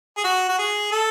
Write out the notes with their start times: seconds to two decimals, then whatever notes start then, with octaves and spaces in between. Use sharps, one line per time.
0.17 G#4
0.24 F#4
0.49 F#4
0.58 G#4
0.92 A4